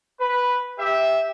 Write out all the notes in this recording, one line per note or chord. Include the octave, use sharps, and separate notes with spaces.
B4
G4 E5